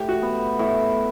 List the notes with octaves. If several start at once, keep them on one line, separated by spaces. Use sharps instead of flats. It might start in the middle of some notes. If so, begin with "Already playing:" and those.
Already playing: A2 G4
F#4
B3
A2 E4